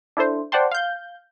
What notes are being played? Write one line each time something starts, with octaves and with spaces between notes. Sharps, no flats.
D4 E4 A4 C5
C5 D5 F#5 G5 A5 C6
F5 G6